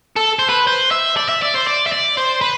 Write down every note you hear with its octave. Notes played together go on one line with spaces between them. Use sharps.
A4
C5
B4
C5
E5
D5
E5
D5
C5
D5
E5
D5
C5
B4